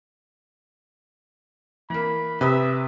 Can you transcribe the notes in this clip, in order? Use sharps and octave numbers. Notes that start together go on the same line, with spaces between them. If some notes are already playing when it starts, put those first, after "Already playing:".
E3 A#3 B5
C3 B4 E5 B5 D#6